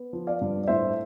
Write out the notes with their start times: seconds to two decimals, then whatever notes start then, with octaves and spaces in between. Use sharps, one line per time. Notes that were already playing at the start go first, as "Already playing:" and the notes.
Already playing: B3
0.13 F3
0.27 D5 F5
0.41 G2
0.63 D5
0.67 A2 C5 E5